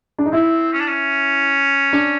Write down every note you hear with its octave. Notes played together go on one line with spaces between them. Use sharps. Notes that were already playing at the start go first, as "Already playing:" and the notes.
D4
D#4
C4 E4
C#4
D4
C#4
D4